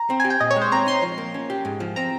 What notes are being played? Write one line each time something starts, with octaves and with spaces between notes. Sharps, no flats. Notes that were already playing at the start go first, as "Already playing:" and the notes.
Already playing: A#5
C4
G#5
G4
G5
A#2 D#5
C#5
G#3
C5
C4 A#5
D#4 C6
F3
A#3
C#4
G4
G#2
F3
C4 A#5